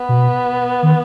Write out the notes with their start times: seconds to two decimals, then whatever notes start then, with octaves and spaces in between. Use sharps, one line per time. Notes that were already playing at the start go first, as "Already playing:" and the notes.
Already playing: B3
0.09 B2
0.83 D#3